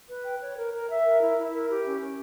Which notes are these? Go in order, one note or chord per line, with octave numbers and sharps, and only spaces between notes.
B4
G5
C#5
A#4
A#4
E5
A#4
E4
E4
A#4
G4
C#4
C#4